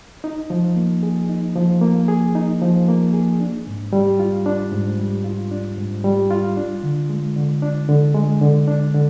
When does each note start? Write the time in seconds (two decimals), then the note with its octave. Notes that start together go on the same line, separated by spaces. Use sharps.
0.24 D#4
0.50 F3
0.76 A#3
1.03 G#4
1.29 D#4
1.56 F3
1.81 A#3
2.08 G#4
2.35 D#4
2.61 F3
2.88 A#3
3.14 G#4
3.40 D4
3.67 G#2
3.93 G3
4.19 F4
4.46 D4
4.72 G#2
4.99 G3
5.24 F4
5.51 D4
5.77 G#2
6.04 G3
6.31 F4
6.57 D4
6.83 D3
7.09 G#3
7.36 D3
7.62 D4
7.88 D3
8.14 G#3
8.41 D3
8.68 D4
8.94 D3